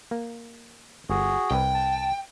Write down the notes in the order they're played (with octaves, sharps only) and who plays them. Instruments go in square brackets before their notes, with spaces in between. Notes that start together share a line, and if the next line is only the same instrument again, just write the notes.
[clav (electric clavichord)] A#3
[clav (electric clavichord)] G1 [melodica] F#4 G#4
[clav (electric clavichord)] C2 B4 [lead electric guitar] G5
[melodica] A5